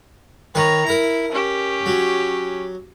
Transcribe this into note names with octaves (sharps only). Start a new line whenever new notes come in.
D#3 B4 C#5 A#5
E4 A#4 A#5
C#4 G4
F#3